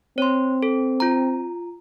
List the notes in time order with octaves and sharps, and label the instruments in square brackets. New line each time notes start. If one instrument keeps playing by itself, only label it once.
[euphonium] C4 [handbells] C#5 C6
[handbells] A4
F4 A#5